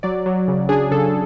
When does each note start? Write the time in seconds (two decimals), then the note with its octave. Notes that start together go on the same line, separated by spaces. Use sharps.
0.03 F#3 D5
0.26 F#3
0.48 C#3
0.69 D4 G#4
0.91 C#3 A4